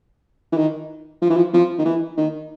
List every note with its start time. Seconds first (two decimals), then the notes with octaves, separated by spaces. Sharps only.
0.52 E3
0.57 D#3
1.22 F3
1.29 E3
1.37 F3
1.53 F3
1.78 D#3
1.85 E3
2.17 D#3